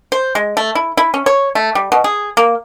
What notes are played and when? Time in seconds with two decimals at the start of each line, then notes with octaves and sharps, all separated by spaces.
0.12 C5
0.35 G#3
0.57 A3
0.75 E4
0.97 E4
1.14 C#4
1.26 C#5
1.55 A3
1.75 G3
1.92 B2
2.04 G#4
2.37 A#3